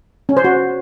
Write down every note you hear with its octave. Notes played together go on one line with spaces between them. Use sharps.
C#4
C5
F#4